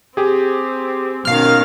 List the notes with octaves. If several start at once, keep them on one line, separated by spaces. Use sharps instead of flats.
C4 G4 G#4
B2 D#3 C#4 F5 F6